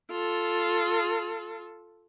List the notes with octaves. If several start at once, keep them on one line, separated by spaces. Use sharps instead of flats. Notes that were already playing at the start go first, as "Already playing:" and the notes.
F4 A4